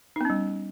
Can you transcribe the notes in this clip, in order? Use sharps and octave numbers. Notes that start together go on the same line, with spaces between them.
G3 B3 C#4 D#4